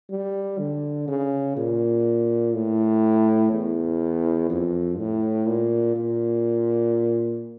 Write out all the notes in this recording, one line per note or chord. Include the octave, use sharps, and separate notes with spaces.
G3
D3
C#3
A#2
A2
E2
F2
A2
A#2
A#2